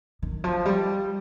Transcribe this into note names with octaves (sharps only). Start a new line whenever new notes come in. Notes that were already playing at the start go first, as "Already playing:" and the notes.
D#3
F3
G3